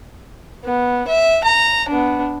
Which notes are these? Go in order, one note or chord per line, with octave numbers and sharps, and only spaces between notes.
B3
E5
A#5
B3 D4